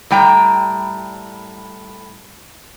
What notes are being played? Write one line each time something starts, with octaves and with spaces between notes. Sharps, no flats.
A2 G3 G5 A#5